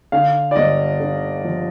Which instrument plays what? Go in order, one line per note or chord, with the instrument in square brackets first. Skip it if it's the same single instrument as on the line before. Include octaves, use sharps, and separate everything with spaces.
[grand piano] D3 F5
D5
G1 D#5
D3
F3